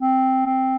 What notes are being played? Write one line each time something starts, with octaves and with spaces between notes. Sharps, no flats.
C4
C4